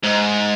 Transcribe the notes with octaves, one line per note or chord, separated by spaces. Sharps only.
G#2